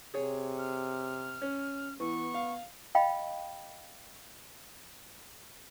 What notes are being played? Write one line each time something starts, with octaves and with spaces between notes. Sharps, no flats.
C3 G#4 C#5
F6
C#4
E3 B3 C#6
F5
D#5 F5 G5 B5